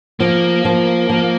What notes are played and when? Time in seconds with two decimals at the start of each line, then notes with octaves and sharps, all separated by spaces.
0.20 F3 A#3
0.65 F3
1.09 F3